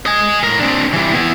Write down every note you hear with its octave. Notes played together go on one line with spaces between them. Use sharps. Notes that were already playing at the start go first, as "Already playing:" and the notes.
D#5 G#5
A2 A#4
C4 D4
E3 G3
B3 E4